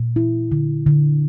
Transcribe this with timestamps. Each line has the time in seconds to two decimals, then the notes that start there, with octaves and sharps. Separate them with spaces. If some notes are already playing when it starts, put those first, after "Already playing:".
Already playing: A#2
0.16 E4
0.52 D3
0.86 D3